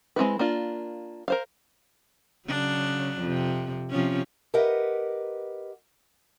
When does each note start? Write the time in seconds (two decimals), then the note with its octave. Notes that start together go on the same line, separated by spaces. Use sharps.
0.16 G#3 C4 E4 B4
0.39 A#3 D4 F4
1.28 A#4 C5 F5
2.47 C#3 F#3 D4
3.20 F2 C3
3.90 C3 F3 C#4
4.54 G4 A#4 B4 D#5 F#5